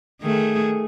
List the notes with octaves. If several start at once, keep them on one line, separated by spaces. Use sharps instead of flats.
D#3 A3 G#4